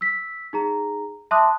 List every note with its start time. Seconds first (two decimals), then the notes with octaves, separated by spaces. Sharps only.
0.01 E6 B6
0.53 D#4 G#4 A#5
1.31 E5 A5 C6 D6 D#6 F#6